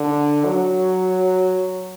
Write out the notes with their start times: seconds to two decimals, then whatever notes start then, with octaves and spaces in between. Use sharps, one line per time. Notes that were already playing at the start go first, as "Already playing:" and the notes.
Already playing: D3
0.46 F#3